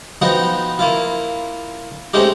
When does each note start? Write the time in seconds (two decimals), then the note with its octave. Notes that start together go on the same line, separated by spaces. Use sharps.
0.22 F3 B3 D#4 F#4 F#5 G5
0.79 A#3 E4 F4
2.14 G#3 A3 C4 C#4 D#4 G4